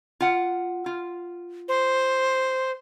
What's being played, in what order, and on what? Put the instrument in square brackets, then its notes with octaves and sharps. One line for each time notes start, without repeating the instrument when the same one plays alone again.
[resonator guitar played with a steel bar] F4 F#5
F4
[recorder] C5